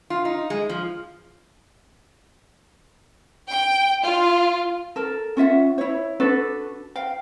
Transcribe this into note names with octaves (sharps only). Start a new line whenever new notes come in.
F4
D#4
G#3
F3
G5
F4
A4 A#4
C#4 F4 E5 F#5
E4 C#5
D4 F#4 A4 B4
F5 G5